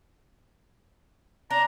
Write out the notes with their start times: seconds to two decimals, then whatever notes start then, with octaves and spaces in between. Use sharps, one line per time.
1.51 D4 A#5